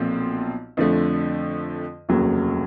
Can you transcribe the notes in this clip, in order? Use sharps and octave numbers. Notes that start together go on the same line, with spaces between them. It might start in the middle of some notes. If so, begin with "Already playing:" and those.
Already playing: B1 A#2 F3 C4
F2 D3 F3 A3
F1 D#2 C#3 F#3